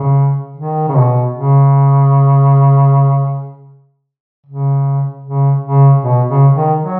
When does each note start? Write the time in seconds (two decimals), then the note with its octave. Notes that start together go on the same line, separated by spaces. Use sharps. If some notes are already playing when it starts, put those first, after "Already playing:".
Already playing: C#3
0.57 D#3
0.88 C#3
0.96 B2
1.35 C#3
4.46 C#3
5.24 C#3
5.63 C#3
6.02 B2
6.28 C#3
6.54 D#3
6.80 F#3